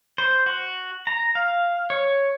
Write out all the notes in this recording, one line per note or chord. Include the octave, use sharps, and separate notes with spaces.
C5
F#4
A#5
F5
C#5